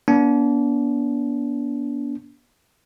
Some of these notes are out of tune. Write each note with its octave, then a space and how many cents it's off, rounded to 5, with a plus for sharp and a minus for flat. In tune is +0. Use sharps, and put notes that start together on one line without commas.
B3 -40 D4 -35